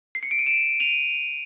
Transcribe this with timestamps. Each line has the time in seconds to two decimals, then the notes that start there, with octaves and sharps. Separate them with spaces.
0.15 C7
0.23 C#7
0.31 D7
0.39 D#7
0.46 D7 E7
0.80 D#7 F7